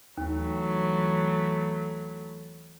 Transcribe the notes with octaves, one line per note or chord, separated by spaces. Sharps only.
D#2 E3 F#3 A3